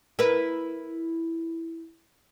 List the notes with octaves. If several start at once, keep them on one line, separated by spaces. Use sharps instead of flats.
E4 A#4 B4